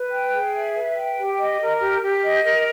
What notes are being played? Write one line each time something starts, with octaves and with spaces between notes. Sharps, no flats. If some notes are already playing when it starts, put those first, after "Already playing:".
Already playing: B4
G5
G#4
E5
B4
G5
G4
D#5
A#4
G4
G4
D#5
A#4